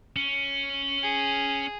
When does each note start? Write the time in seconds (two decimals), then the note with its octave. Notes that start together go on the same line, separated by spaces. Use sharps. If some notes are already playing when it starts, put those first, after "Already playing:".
0.16 C#4
1.03 G#4